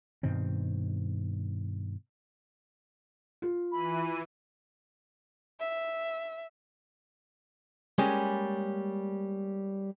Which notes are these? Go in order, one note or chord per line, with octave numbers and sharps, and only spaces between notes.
G2 B2 D#3 C4
F4
E3 B5 D#7
E5
G3 G#3 A#3 C#4 G#4 D5